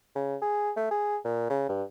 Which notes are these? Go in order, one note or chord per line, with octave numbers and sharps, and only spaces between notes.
C#3
G#4
A3
G#4
A#2
C#3
G2